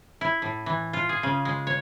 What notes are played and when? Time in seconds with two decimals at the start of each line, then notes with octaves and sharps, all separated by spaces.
0.21 E4
0.42 A2
0.66 E3
0.93 F4
1.09 G#4
1.23 C#3
1.45 G#3
1.67 C#5